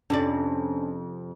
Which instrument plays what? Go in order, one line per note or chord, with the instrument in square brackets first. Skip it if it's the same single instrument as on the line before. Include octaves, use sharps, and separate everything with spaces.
[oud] F2 C3 D5 [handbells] C#4 D4